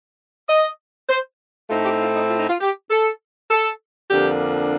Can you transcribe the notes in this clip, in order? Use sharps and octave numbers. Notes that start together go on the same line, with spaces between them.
D#5
C5
A2 A3 C4 D#4 F4
G4
F4
D#4
F4
D#4
F4
G4
A4
A4
F2 D3 F3 A#3 D4 G4